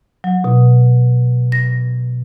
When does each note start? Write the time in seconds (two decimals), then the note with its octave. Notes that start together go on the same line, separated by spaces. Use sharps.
0.24 F#3
0.44 B2
1.52 A#6